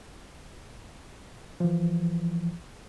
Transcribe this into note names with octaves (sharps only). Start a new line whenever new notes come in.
E3 F3